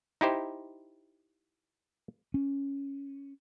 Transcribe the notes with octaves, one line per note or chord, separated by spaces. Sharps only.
D#4 E4 G4 C5
C#4